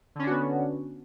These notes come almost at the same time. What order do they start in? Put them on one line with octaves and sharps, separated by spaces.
D3 C#4 D4 F#4 B3